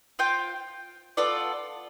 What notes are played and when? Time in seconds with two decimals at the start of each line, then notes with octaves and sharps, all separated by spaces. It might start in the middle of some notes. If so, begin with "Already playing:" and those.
0.19 F4 C5 G5
1.17 B3 F4 A4 D5